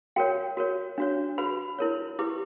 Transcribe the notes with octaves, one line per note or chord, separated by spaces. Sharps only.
F#4 A#4 C#5 G5
F#4 A#4 C#5
D4 F#4 C#5
F#4 B4 B5
E4 A#4 C#5
E4 G4 B4 D6